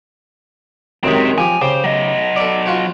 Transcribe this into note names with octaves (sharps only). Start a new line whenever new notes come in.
F#2 D#3 G#3 C4 G4
F3 G4 G#5
C#3 G4 C5
F#3 D#5
A4 D5
F4 F#4 C5